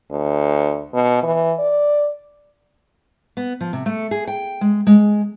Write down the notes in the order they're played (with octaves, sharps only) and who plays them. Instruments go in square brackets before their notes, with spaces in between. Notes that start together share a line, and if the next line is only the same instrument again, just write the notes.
[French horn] D2
B2
E3
D5
[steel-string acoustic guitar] B3
F3
C3
A3
G#4
G5
G#3
G#3